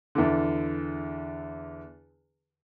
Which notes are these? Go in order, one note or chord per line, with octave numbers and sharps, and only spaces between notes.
E2 D3